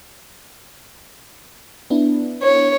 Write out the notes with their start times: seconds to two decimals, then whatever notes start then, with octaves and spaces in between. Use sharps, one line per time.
1.90 B3 D4 E4
2.43 C#5